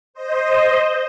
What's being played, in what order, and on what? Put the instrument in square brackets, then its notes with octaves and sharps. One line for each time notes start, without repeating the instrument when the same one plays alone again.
[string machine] C5 D#5